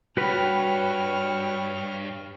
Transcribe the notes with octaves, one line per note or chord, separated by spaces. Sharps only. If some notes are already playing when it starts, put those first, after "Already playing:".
G2 F#4 B4 C#5 G5 B5 F6